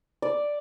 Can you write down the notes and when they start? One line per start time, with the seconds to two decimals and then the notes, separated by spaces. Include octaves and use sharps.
0.22 D5